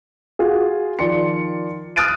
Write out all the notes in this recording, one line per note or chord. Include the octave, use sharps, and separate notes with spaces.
F4 F#4 G#4
D#3 F3 D5 C6 C#7
D#6 F6 F#6 A6 D7 D#7